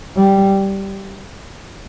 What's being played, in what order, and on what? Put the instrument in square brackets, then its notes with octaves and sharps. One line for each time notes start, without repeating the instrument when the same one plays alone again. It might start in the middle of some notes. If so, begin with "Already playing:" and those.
[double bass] G3